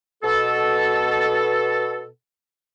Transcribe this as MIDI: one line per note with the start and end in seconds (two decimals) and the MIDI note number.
0.23 2.06 47
0.23 2.06 69